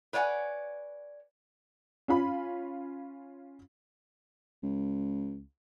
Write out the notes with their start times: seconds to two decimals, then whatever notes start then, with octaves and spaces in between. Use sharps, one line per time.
0.13 B4 C#5 D5 F#5 G#5
2.08 C#4 F4 B5
4.63 C#2